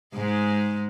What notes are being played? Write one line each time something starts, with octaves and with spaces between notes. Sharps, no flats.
G#2 G#3